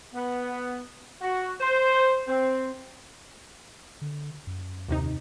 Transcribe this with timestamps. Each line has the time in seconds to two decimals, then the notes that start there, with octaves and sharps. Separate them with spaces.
0.14 B3
1.21 F#4
1.60 C5
2.28 C4
4.02 D3
4.47 F#2
4.89 D#2 C3 D#4